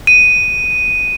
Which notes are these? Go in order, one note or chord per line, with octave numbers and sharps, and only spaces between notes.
D#7